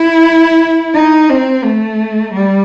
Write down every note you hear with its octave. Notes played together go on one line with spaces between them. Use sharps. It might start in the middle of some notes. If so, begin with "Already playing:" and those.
Already playing: E4
D#4
C4
A3
G3